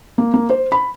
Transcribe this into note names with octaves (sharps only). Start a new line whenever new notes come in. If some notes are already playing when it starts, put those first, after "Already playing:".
A#3
A#3
C5
B5